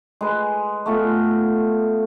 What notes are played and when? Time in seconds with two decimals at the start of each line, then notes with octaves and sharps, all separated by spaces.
0.21 G#3 B4
0.86 A3 B3 F4